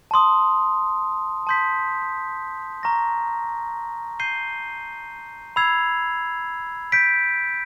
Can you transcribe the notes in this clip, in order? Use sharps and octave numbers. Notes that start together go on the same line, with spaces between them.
A5 C6 D#6
A5 C6 D#6 G6 B6
A#5 C#6 F6 A#6
G6 C7 D#7 G7
B5 E6 G#6 C7 F7
G6 B6 D7